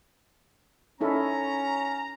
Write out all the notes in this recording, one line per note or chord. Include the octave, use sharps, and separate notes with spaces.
C#4 D#4 E4 A4 A#5